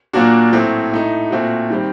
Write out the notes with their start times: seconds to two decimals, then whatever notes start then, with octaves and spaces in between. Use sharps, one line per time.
0.13 A#2 F#3 A#3 D4 F#4
0.52 A2 F#3 A3 C4
0.91 A2 A3 D#4
1.31 A#2 A3 C4 F#4
1.70 D#3 G3 C4